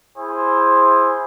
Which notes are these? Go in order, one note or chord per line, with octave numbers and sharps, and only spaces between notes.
E4 G#4 C5